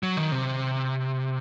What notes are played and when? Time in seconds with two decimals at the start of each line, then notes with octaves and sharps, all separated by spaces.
0.03 F#3
0.17 D#3
0.32 C3